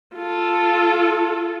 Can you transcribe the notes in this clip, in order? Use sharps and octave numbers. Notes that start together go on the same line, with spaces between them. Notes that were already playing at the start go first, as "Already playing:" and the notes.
F4 A4